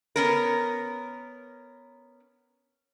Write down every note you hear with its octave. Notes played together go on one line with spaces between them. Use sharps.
B3 C#4 A#4